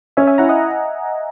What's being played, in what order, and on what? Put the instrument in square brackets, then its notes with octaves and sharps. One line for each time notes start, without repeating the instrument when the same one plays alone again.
[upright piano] C#4 [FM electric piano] E5 G#5
[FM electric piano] E5 G#5
[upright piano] E4 [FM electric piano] F#5 A#5
[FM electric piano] D#5 F#5